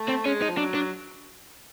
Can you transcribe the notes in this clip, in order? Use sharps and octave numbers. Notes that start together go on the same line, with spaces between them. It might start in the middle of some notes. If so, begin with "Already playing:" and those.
Already playing: A3
C4
G#3 C#4
D#4
F3
F#3 D4
D4